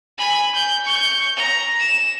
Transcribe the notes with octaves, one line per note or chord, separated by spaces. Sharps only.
G#5 B5
G6
C#6 G6
A#5
E7